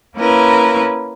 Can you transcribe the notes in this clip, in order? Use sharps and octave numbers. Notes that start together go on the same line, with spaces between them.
A#3 C#4 E4 A#4 B4